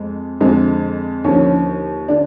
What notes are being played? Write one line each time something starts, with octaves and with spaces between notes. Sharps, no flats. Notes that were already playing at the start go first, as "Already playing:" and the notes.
Already playing: F2 G#3
F2 D3 F3 G#3
D#2 D3 F3 C#4
D3 D4